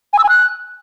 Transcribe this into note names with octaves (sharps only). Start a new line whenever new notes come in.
G#5
E6
G#5
F#6